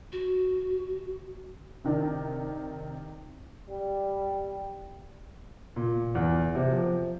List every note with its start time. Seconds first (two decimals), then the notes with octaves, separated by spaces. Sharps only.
0.12 F#4
1.84 C3 D#3 D4
3.69 G3
5.76 A#2
6.15 E2
6.55 C3
6.72 F3